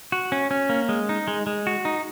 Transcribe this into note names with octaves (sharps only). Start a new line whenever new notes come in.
F#4
C#4
C#4
A#3
G#3
D#4
G#3
G#3
F#4
D#4